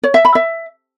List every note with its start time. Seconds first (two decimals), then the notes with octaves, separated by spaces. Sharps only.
0.04 C#5
0.14 E5
0.25 B5
0.35 E5